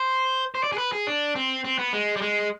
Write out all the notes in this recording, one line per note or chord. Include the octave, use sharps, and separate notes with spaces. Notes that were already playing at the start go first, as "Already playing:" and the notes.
Already playing: C5
C5
D5
G#4
B4
G#4
D4
C4
C4
B3
G#3
G3
G#3